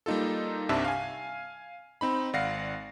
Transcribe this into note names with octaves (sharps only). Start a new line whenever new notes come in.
G3 A#3 D#4 F4 A4
C2 G2 C3 D4 E5 A5
F5 G#5
C4 D#4 B5
G#1 D5 F5 F#5 A#6 C7